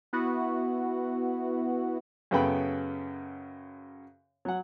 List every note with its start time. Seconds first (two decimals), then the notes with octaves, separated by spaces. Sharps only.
0.13 B3 E4 F#4
2.31 F#2 C#3 B3 A4 G5 B5
4.45 F#3 F#5